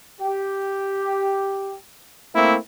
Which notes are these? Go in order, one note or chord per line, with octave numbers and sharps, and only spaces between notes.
G4
A3 A#3 C4 E4